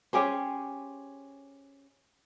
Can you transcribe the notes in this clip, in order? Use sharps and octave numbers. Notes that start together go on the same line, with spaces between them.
C#4 G4 G#4 C5